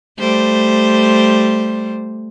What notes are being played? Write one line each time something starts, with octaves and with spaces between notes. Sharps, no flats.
G3 A3 C5